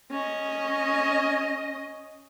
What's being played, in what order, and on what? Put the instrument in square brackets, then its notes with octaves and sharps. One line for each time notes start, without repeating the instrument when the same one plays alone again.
[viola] C#4 D#5